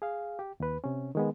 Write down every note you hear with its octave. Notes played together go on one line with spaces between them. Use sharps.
G#4 F5
G4
D#2 B4
C3 C#4
D#3 G#3 B3